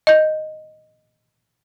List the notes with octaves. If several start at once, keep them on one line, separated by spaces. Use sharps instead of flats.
D#5 G6